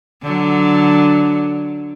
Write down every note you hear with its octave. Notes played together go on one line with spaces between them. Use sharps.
D3 F#3